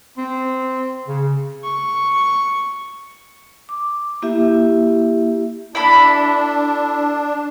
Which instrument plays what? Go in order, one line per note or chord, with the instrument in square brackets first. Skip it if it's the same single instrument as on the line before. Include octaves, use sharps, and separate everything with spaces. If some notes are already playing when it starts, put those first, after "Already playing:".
[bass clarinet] C4
C#3
[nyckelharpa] C#6
[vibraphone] D6
A#3 E4 G4 E5
[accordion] D4 [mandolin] E4 A4 B5